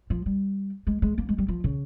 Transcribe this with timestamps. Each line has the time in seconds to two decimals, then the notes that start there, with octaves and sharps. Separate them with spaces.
0.10 F3
0.26 G3
0.87 G#3
1.02 G#3
1.18 A#3
1.29 G#3
1.38 G3
1.48 F3
1.64 C#3